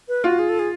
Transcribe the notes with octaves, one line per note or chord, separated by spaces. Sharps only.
B4
F4 F#4
G#4
A4
G#4